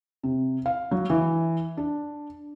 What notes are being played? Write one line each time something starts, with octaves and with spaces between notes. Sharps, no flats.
C3
F5
F#3
E3
D4